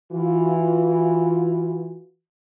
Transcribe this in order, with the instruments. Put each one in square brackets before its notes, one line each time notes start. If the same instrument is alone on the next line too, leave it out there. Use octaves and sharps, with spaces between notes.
[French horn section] E3 F4 F#4